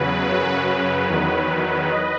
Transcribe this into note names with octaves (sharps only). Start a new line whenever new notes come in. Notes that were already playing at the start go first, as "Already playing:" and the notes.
Already playing: E2 C#3 F#3 B4
F#2 C#3 F#3
E2 D#3 F#3
D#5